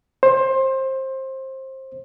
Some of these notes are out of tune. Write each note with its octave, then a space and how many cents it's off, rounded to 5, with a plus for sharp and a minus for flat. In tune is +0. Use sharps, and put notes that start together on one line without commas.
C5 +20